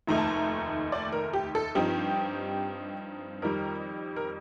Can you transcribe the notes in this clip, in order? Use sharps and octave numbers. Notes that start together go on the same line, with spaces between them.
F1 D#2 D#3 A3 D#4 A#5
A5
A#5
D5
A#4
G4
A4
G2 F3 C4 D#4 G4
F2 D#3 G3 A#4
A#4